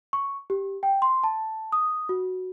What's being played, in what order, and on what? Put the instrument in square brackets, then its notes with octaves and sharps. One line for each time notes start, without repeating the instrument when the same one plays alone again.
[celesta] C#6
G4
G5
C6
A5
D#6
F#4